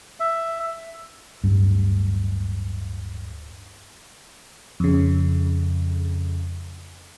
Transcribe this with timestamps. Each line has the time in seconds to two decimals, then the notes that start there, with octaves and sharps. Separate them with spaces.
0.20 E5
1.44 D1 G2
4.80 F2 C#3